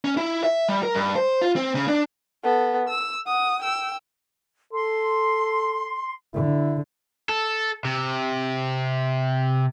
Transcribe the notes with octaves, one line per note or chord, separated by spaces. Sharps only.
C#4
E4
E5
G3
A#4
G2
C5
F4
C4
C#3
D4
B3 A4
E6
F#5 D#6
G5 E6
A4 C6
D3 E4
A4
C3